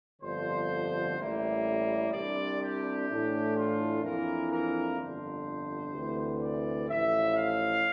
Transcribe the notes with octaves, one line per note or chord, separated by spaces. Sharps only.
G1 F2 D3 F3 C5
A1 A2 G3 A#3 E5
C2 C3 G3 D4 D5
G4
A2 E3 A3 D4
F4
F2 E3 A#3 D4 A#4
A#4
G1 F2 D3 C5
D2 C3 E3
D5
A1 A2 F3 E5
F5